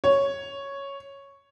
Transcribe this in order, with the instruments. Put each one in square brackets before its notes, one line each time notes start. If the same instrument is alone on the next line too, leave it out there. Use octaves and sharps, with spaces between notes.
[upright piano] C#5